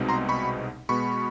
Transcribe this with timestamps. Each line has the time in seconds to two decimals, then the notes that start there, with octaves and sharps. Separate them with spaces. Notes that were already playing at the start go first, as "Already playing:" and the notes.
Already playing: C2 B2 G#3 C4 D#4
0.08 A#5 C6
0.29 B5 C#6
0.89 B2 G#3 B3 B5 C#6